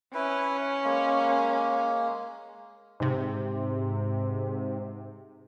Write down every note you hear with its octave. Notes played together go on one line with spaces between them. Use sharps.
C#4 E4 B4
G#3 A#3
G#2 C3